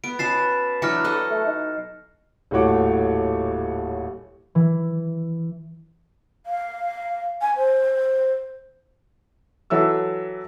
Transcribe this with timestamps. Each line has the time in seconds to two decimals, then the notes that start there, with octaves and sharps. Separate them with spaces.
0.04 B3 D7
0.19 B2 B3 C#4 A6 C7 E7
0.82 E3 F#3 D4 F6 A#6 C#7
1.04 F#4 A4 D#5
1.31 A3
1.46 D#4
2.51 D#1 A2 A3 F#4 C#5 D6
4.55 E3
6.46 F5
7.42 G#5
7.57 C5
9.70 E3 F#3 A4 E5 E6